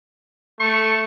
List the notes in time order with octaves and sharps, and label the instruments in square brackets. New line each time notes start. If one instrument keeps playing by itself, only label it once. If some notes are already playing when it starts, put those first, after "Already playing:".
[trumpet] A3 [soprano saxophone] C#6